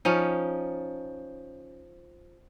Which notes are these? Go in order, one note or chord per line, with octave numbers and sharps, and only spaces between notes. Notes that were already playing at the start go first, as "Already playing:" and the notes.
F3 C#4 D#4